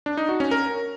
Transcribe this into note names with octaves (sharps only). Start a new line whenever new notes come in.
D4
D#4
F#4
C#4
A#4